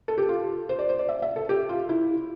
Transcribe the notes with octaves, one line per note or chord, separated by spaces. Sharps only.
A4
G4
F4
C5
D5
C5
D5
E5
E5
A4
G4
F4
E4